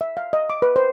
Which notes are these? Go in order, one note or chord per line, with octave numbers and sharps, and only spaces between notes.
E5
F5
D#5
D6
B4
C5